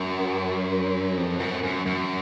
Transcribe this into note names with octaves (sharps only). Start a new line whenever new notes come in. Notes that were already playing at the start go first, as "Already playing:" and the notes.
Already playing: F#2
F2
F#2
F#2
F#2